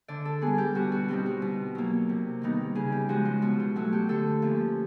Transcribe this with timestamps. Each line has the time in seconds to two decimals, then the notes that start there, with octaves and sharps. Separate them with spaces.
0.08 D3 D5
0.25 A4
0.41 G3 B3 G#4
0.58 G4
0.75 B2 F#4
0.92 F#4
1.09 G3 C4 D#4 F4
1.26 F#4
1.42 B2
1.75 F#3 A#3
2.09 C3
2.42 D#3 G3 B3 D#4
2.75 C#3 G#4
2.92 G4
3.09 F3 G#3 F#4
3.25 F4
3.42 B2 F#4
3.60 F4
3.76 F#3 A3 F#4
3.93 G4
4.09 D3 A4
4.42 F3 A#3 C#4